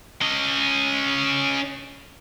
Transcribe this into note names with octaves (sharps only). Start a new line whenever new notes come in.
C#4 D#5